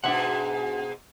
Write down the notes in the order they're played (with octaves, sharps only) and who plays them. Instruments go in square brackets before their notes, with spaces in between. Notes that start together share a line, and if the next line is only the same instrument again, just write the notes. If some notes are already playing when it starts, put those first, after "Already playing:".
[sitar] G#2 B2 [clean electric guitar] D4 E5 F#5